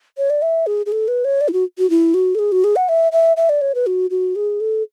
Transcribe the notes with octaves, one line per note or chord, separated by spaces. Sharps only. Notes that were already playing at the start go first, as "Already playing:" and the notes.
C#5
D5
E5
G#4
G#4
A4
B4
C#5
D5
E4
F#4
F#4
E4
F#4
A4
G#4
F#4
G#4
F#5
E5
E5
E5
D5
C#5
B4
F#4
F#4
G#4
A4